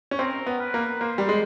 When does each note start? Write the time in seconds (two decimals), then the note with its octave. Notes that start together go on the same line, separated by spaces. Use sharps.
0.11 C#4
0.19 C4 A#4
0.46 B3
0.60 B4
0.74 A#3
1.01 A#3 C5
1.18 G3
1.29 G#3